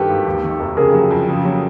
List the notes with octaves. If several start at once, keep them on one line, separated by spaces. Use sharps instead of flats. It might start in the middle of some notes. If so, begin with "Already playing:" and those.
Already playing: G2 D#3 G4 A4 B4
G#1
D#2
D#3
F1
C#3 G#4 A#4
F#3
F2
C#3
F#3